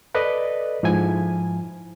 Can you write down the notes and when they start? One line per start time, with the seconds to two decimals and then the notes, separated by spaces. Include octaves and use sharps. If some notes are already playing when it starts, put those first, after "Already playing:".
0.15 A4 B4 D5 D#5
0.83 G#2 F3 E4 G#5